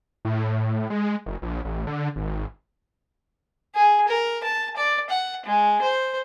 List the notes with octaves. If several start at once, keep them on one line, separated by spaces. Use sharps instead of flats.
A2
G#3
F#1
A#1
A1
D3
G#1
G#4
A#4
A5
D5
F#5
G#3
C5